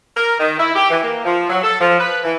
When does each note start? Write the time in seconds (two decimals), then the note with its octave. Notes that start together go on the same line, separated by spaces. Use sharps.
0.17 A#4
0.40 D#3
0.58 E4
0.76 G4
0.90 E3
1.04 A#3
1.24 F3
1.49 F#3
1.63 A4
1.81 F3
1.99 B4
2.24 E3